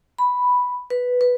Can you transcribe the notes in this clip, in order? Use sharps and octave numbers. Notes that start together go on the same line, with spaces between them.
B5
B4
B4